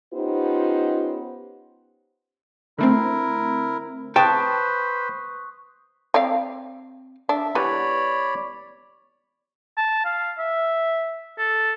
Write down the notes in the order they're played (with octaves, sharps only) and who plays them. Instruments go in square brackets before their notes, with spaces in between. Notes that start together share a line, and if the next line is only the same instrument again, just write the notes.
[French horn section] B3 C#4 D#4 F4 G4 C5
[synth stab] D3 A3 C4 [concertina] E4 A#4
[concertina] B4 C5 [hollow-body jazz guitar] G5 A5 [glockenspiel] C#6 D#6 F#6
[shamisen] C4 D5 F5
[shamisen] D4 [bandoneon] E5
[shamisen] E3 G3 B3 [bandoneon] C#5 D5 B5
[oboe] A5
F5
E5
A4